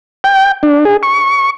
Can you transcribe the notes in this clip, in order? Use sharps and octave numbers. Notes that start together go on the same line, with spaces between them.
G5
D4
G#4
C#6